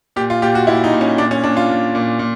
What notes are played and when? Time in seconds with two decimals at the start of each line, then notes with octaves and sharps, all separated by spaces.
0.16 A#2 G4
0.30 F4
0.42 A#2 G4
0.55 F#4
0.67 A#2 E4
0.84 D#4
0.93 A#2
1.01 C#4
1.18 A#2 D4
1.31 C#4
1.44 A#2 D4
1.57 F4
1.69 A#2
1.95 A#2
2.19 A#2